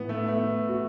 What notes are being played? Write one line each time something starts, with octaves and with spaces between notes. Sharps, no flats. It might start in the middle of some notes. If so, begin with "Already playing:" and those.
Already playing: A2 E3 B3
A3
A3 B3
F#4